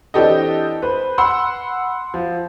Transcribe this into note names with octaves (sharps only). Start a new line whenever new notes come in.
E3 C4 D4 G4 A4 D#5
B4 C5
F#5 B5 C6 E6
F3